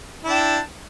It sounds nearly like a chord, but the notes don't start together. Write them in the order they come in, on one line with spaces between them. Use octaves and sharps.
E4 D4 G5